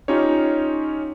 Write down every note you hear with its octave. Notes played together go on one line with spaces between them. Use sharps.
C#4 D#4 F4 G4 C#5